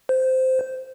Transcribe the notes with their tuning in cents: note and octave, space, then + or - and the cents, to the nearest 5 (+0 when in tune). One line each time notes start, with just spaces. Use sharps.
C5 -10